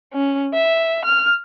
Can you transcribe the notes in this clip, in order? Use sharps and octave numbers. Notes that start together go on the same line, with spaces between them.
C#4
E5
F6